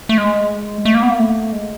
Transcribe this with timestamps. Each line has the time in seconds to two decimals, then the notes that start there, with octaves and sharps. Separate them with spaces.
0.09 A3
0.18 G#3
0.85 A3
0.94 A#3
1.03 B3
1.10 A#3
1.19 A3
1.53 G#3